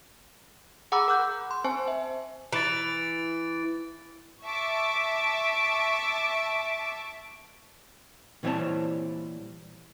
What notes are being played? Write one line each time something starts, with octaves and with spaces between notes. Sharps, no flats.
G#4 F#5 A#5 B5 D6 E6
A#4 F#5 D6 E6 F#6 G6
C6
C4 C5 G#5 A5
E5
E3 A6 D7
E5 A5 C#6 D6
A#2 E3 G3 C4 C#5 A5